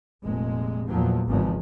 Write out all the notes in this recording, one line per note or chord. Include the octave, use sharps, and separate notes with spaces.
F1 A#2 G#3
E2 A#2 F3 F#3
G#1 E2 G#2 C#3 F3 G#3